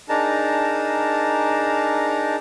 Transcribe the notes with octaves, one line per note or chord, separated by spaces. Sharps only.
D4 D#4 G#4 A#4 A5 A#5